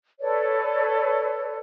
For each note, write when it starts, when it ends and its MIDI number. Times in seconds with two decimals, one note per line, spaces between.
0.20 1.58 69
0.20 1.58 71
0.20 1.58 73
0.20 1.58 74